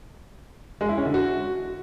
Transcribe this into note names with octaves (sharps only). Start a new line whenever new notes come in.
G#3
E4
C#4
D3
F#4